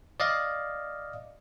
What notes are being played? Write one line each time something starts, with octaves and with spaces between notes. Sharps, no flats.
D5 D#5 F5